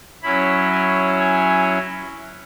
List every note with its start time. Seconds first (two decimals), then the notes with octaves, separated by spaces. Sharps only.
0.23 F#3 C#4 E4 B5
0.71 G#5
1.19 G#5